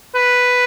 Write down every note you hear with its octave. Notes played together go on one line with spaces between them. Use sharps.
B4